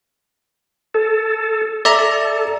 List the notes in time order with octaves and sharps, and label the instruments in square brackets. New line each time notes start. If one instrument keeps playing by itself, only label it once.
[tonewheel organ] A4
[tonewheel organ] A4 [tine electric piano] D5 E5 A#5